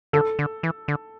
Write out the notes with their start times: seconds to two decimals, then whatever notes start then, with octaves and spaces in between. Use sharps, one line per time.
0.13 D3 A4
0.39 D3
0.63 E3
0.88 D3